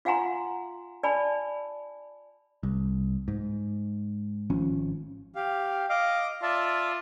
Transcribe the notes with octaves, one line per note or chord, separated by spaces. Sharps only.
F4 F5 F#5 G#5 A#5 C6
D5 G#5 A5 B5
C2
G#2
G#1 F3 C#4
G4 F5
D#5 F5 D6
F4 D5 E5 A5